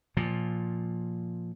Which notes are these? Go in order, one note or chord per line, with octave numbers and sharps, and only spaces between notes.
A#2 F3